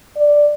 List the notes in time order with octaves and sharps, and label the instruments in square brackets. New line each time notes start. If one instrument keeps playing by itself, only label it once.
[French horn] D5